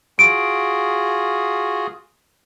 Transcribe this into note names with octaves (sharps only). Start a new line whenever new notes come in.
F4 F#4 G#4 D7